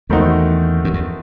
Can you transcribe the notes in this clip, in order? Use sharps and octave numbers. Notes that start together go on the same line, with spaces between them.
E2 D#3 A3 C4 D#4 F#4
F#2
E2